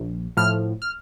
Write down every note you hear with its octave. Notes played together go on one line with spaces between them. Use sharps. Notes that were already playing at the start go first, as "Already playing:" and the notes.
Already playing: A#1
A2 F3 F6
F6